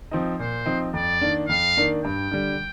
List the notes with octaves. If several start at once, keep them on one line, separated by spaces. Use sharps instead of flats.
F3 C4 D#4
A#2 C5
F3 C4 D#4
F2 D5
D#3 A#3 D4
F2 F5
D#3 A#3 D4
G2 G5
D3 G3